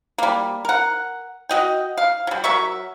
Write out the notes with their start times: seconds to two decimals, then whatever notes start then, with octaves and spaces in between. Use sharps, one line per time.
0.18 G3 A#3
0.65 A#4 F#5
1.49 F#4 D#5 G5
1.97 F5
2.27 F#3 G3
2.44 F#3 A#4 E5 C#6